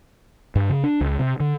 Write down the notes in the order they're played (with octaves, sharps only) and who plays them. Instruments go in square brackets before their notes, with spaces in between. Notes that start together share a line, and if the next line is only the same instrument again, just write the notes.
[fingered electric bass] G2
C#3
D4
C#2
C3
D3